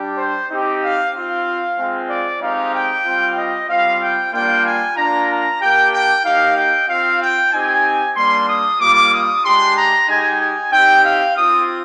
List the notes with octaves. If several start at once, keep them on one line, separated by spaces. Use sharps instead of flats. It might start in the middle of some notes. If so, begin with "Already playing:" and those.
Already playing: G3 D4 G4
C5
C4 D#4 G4
F5
C4 F4 F5
G#3 C4 F4
D5
G#3 C4 D#4 G4 F5
G5
G3 C4 F4
D#5
G3 C4 F4 F5
G5
G3 A#3 D4 F4 G5
G#5
A#3 D4 F4 A#5
A#5
A#3 D4 G4 G5
G5
A#3 D#4 G4 F5
G5
C4 F4 F5
G5
C4 D#4 G4 G#5
G3 A#3 D4 C6
D#6
G3 A#3 F4 D6
D#6
G#3 D4 G4 C6
A#5
G#3 D#4 G4 G#5
G#5
C4 D#4 G4 G5
F5
C4 F4 D#6